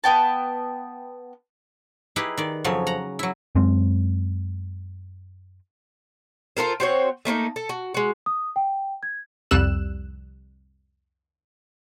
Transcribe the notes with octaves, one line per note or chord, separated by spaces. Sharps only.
B3 G5 A5
D#4 E4 G4 G#4 B4
D#3 D5
F2 C#3 F3 F#3 C#5
F#5 A#5
F#3 E4
F#2 G#3 C4
F4 A4 A#4 C5
C4 F#4 C5 C#5
A3 A#3 C#4 D#4
A4
F#4
G#3 F#4
D#6
G5
G#6
C2 F2 G3 E6 F#6 E7